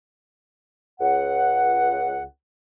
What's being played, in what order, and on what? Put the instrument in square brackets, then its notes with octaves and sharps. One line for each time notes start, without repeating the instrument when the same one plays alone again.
[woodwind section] C#2 F#5